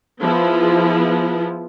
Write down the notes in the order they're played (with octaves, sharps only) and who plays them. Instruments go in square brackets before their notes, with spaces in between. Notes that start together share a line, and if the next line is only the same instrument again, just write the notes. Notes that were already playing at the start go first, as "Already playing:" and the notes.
[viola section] F3 B3 E4 G#4